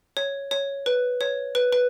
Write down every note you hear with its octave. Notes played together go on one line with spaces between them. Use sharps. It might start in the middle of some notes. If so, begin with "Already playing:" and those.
C#5
C#5
B4
C#5
B4
B4